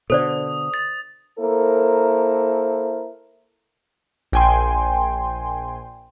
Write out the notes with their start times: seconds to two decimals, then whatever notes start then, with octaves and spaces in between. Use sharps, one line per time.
0.10 B2 D3 A4 C5 D5 D#6
0.74 A6
1.39 A#3 E4 A4 A#4 C5
4.32 A#1 G5 G#5 C6